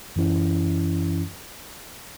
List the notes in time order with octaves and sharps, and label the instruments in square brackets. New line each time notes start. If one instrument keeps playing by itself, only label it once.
[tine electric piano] F#2 E3 C#4 E4